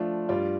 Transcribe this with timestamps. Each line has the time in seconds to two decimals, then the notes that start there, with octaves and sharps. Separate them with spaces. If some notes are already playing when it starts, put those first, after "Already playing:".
Already playing: F3 A3 D4 F4
0.29 G2 G3 F4 D5